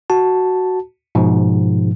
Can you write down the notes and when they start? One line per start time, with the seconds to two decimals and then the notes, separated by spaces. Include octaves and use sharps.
0.10 F#4 A5
1.15 G#2 B2 F3